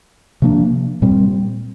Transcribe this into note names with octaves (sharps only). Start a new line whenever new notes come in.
C3 F3 A#3 D4
A#2 G3 C4